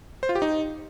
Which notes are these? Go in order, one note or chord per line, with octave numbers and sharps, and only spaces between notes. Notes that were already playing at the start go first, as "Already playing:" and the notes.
C5
F4
G4
D#4